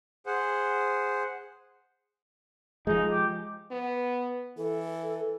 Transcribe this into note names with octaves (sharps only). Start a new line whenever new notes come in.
G#4 C5 F#5
F3 G#3 D#4
G4
B3
E3 A4